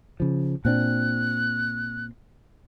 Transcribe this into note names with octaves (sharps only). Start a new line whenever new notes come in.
C#3 F3
A#2 C4 D4 F#6